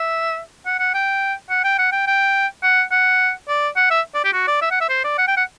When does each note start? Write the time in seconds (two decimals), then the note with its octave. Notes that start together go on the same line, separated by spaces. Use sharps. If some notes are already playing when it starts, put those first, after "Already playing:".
Already playing: E5
0.66 F#5
0.79 F#5
0.94 G5
1.50 F#5
1.64 G5
1.79 F#5
1.92 G5
2.07 G5
2.63 F#5
2.91 F#5
3.48 D5
3.76 F#5
3.91 E5
4.15 D5
4.24 G4
4.33 F#4
4.47 D5
4.62 E5
4.71 F#5
4.81 E5
4.89 C5
5.04 D5
5.18 F#5
5.27 G5
5.37 F#5